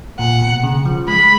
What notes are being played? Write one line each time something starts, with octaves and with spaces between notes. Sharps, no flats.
A#2 F#5
B2
C#3
F3
G#3 B5